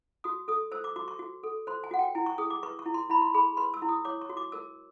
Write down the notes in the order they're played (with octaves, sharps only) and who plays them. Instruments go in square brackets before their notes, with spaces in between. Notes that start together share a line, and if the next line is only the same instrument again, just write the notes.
[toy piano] F#4 D#6
A4 D#6
C5 E6
D6
F#4 D6
C#6
F#4
A4
C5 C6
G#5
F#4 F#5
G5
E4 G#5
C#6
G#4 D#6
D6
B4 C#6
C#6
E4
C6
E4 B5
C6
G#4 B5
B4 C6
E6
E4
D#6
C#5 D6
C#6
F#4
D6
A#4 E6